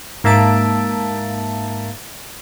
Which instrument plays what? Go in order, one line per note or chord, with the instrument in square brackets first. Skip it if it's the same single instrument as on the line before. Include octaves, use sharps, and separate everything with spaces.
[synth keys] G#2 A#3 E5 A5 D7